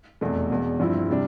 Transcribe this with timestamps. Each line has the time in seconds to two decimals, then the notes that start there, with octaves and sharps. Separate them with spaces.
0.21 F1 E2 B2 A3
0.50 E1 E2 B2
0.80 G2 F3 C4 E4
1.10 C3 G3 D4